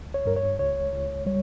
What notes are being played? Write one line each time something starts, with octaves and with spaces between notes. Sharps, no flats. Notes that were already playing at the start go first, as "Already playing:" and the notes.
Already playing: D2
C#5
G2 A#4
C#5
C#2 C#5
C#2
G3 C#5